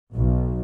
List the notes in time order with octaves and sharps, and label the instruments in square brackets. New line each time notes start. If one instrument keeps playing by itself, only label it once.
[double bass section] B1